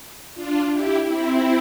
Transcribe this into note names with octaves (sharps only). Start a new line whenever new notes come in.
D4 F4
E4 G4
C4 E4